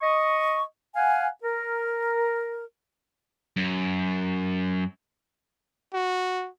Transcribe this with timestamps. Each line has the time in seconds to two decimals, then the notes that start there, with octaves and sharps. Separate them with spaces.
0.02 D#5 C#6
0.96 F5 F#5 G#5
1.43 A#4
3.56 F#2
5.94 F#4